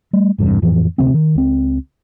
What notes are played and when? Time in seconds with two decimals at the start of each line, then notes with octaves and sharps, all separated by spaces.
0.13 G3 A3
0.38 G#1 E2 G2 C3
0.62 F2 A2 E3 F3
0.98 D2 C3 D#3 C4
1.14 D#3
1.35 C#2 C4